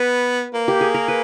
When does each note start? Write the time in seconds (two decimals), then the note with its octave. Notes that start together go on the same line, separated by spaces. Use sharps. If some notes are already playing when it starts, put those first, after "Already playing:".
Already playing: B3 B4
0.54 A#3
0.68 G4
0.81 G#4
0.94 A#4
1.08 B4